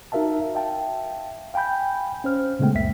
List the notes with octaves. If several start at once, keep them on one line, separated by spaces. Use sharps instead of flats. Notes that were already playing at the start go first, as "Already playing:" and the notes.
D#4 F#4 A#4 E5 F5 A5
E5 F5 G5 A5
F5 G5 G#5 B5 G6
C#4 C5 F6
A#2 C#3 G#3 A3 B3 G5
C#2 F#2 A#3 E5 B6